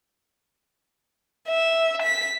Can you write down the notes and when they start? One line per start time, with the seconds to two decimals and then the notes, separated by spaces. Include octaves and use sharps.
1.50 E5
2.03 B6